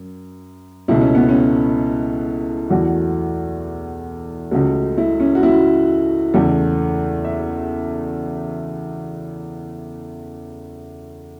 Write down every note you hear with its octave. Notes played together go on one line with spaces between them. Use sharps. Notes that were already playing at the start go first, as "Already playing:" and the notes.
Already playing: F#2
C#2 B2 A3 E4
C#4
B3
C#4
E2 E3 A3 F#4
C#2 C#3 A3 F#4
E4
C#4
F#4
E4
E2 C#3 A3
E5